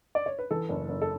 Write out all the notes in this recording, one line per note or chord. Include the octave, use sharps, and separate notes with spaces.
D5
C#5
B4
E3 A4
F#1
F#1
A4